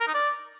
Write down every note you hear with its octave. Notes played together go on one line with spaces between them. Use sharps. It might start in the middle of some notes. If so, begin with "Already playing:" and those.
A#4
D#4
D5